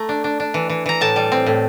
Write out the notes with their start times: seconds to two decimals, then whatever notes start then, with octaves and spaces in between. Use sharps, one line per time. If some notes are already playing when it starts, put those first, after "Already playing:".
Already playing: A3 A#5
0.09 D4
0.24 D4
0.40 D4
0.54 E3
0.69 E3
0.86 E3 A#5
1.01 A2 A5
1.16 G3
1.32 C4
1.46 A2